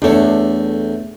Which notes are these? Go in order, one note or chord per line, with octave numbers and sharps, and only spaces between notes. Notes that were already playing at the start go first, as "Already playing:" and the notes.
E2 A3 D4 A4 C#5